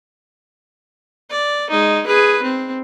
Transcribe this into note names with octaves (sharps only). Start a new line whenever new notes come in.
D5
G#3 D#4
G#4 B4
C4